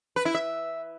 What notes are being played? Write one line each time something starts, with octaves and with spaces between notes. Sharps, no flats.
B4
E4
E5